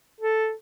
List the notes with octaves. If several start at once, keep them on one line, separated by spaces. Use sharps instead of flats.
A4